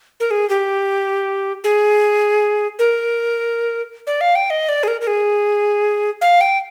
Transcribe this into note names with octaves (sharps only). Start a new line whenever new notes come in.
A#4
G#4
G4
G#4
A#4
D5
F5
G5
D#5
D5
G#4
A#4
A#4
G#4
F5
G5